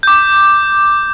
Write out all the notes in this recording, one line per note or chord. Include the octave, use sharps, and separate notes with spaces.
D6 G6